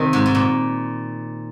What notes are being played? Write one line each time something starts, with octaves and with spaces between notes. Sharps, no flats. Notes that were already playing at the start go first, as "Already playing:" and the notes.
Already playing: C3 D#3
G#2
G#2
A#2